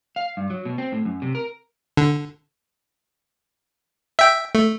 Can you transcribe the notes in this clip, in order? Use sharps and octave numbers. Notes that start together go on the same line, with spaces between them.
F5
G2
F#3
B2
C4
A2
F#2
C3
A#4
D3
E5 G5
A3